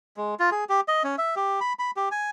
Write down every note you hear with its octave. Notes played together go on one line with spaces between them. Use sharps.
G#3
F4
G#4
G4
D#5
C#4
E5
G4
B5
B5
G4
G#5